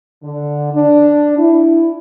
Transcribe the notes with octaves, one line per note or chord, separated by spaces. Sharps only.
D3
D4
E4